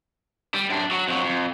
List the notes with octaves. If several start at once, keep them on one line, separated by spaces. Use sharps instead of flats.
G3
F#2 D4
F#3 F#4
F2 F#3
F2